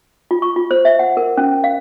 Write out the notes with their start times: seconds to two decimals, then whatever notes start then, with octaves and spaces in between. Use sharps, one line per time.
0.31 F4
0.42 C#6
0.56 F4
0.71 C5
0.85 E5
0.99 F#5
1.17 A#4
1.37 C#4
1.64 F5